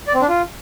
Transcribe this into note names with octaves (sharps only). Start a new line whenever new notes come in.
D5
C4
D4
F4